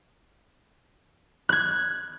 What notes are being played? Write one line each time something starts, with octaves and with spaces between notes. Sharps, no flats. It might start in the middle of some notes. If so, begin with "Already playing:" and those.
F#6 G#6